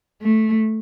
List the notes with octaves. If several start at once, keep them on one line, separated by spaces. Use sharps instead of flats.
A3